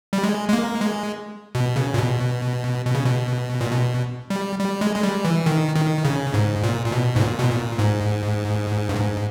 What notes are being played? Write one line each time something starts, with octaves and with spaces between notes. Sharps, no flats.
G3
G#3
G#3
A#3
G#3
B2
C#3
A#2
B2
B2
C#3
B2
A#2
B2
G3
G3
G#3
G#3
G3
E3
D#3
D#3
C#3
G#2
A#2
A#2
B2
G#2
A#2
B2
A#2
G#2
G2
G#2